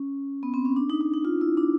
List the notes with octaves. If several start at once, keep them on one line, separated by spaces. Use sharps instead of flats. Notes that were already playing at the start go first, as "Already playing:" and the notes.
Already playing: C#4
B3
C4
C#4
D4
D#4
D#4
D#4
F4
E4
D4